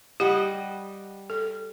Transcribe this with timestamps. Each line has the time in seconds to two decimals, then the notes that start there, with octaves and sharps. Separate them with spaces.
0.20 G3 G4 D#5 F#5
1.30 A4